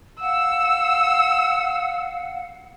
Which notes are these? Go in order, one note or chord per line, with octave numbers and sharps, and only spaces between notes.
F5 F#5 E6